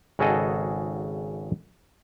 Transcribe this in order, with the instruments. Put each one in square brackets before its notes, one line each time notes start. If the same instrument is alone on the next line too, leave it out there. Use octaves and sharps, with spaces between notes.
[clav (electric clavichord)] G#1 C#3 F#4 G#4 A4 D#5